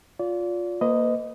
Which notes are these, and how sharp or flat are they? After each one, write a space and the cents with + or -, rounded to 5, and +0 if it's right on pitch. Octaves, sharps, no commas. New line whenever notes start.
F4 +15 D5 -30
A#3 +0 B4 +45 D#5 +0